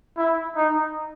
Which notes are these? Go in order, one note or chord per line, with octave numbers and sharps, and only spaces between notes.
E4
D#4